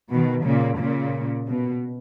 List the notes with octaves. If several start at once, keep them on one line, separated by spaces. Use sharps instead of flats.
B2 D#3
A#2 C#3
A#2 C#3
B2